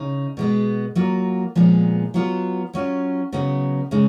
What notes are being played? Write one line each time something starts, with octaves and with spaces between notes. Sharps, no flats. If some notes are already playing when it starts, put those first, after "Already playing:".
Already playing: C#3 D#4
B2 G#3 B3
F#3 A#3 F4
A#2 F3 G#3 B3 D#4
F#3 B3 F4
F#3 C#4 F4
C#3 F#3 B3 D#4
C#3 G#3 D#4